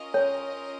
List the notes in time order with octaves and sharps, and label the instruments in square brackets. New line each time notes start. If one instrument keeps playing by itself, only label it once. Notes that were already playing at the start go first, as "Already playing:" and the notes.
Already playing: [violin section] C#4 F4 A#4 D#5
[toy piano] C#5